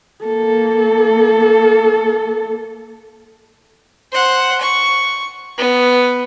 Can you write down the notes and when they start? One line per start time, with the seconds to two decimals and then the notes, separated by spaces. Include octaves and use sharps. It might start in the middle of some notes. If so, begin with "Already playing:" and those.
0.24 A#3 A4
4.12 C5 F#5
4.61 C#6
5.58 B3